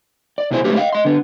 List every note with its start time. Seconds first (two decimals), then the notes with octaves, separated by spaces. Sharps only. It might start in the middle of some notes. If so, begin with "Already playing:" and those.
0.38 D5
0.51 C2 B2 E4 G#4 C5 C6
0.64 G#3 A3 C4 C#4 G4 B4
0.77 D#5 F5
0.93 D#5 C6
1.05 D3 B3